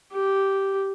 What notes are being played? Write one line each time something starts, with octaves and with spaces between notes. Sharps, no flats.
G4